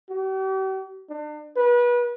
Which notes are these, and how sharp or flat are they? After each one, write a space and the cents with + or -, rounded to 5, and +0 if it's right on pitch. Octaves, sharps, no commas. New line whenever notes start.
G4 -45
D4 +40
B4 -30